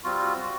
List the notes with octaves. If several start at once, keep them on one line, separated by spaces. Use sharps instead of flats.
G3 C4 F4 F#4
F#4